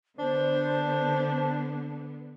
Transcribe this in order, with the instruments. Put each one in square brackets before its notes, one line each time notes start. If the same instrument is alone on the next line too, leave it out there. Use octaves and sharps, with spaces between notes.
[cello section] D3 B3 [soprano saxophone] D4 [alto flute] C5